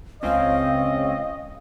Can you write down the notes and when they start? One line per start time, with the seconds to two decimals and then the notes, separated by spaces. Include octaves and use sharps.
0.23 C#2 C4 C#4 D#5 F5